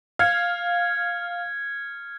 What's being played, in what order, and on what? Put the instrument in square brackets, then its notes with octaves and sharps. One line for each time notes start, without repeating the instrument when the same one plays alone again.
[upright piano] F5 [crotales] F6 G#6 C#7